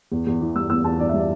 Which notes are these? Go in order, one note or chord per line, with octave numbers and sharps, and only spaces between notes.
E2
E2
E3
G3 E6
E2 E6
E2 A5
E3 D5
G3 E5
D5